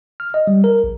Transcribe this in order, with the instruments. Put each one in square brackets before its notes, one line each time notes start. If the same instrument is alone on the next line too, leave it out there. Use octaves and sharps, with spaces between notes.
[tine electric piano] F6
D#5
G3
A#4
A#1